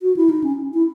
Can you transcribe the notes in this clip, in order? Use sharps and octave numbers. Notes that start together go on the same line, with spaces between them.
F#4
E4
D#4
C#4
E4